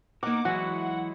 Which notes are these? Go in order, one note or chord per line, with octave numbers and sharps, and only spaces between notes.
A#3 D#4 A#4 F#5 D6
E3 F#3 G#3 E4 F#4 F#5